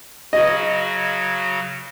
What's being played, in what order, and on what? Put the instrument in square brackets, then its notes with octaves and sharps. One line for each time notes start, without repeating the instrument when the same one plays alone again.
[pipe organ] C#3 F#3 F#4 [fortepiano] D#5